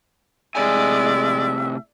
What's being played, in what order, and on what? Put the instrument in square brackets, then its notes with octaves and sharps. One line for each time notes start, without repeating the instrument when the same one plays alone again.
[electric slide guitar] A2 C3 G#5 [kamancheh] G#3 D5 [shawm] E5